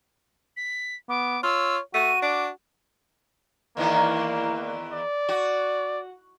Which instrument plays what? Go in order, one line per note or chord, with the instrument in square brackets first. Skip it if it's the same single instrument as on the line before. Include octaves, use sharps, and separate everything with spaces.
[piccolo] B6
[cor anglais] B3 [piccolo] D6
[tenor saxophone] F4 [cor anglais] C#5 [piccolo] E6
[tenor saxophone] A3 [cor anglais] F#4 [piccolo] D#7
[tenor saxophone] D4 [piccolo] D6
[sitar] E2 D#3 E3 [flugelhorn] A#3
[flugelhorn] D5
[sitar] F#4